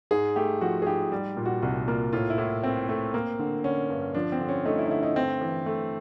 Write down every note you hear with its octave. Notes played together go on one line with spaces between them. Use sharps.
G#2 G#4
A3 G4
F3 F#4
G#4
G#2 G4
G3
A#2
F#4
C2 F#4
A#3 F4
A2 F4
E4
A2
A3 C4
A3
A#3
D3
D3 C#4
G2
F3 D4
C4
D3
C#4
A3 D#4
E4
D#4
D3 E4
D#4
G2 C4
E3
A3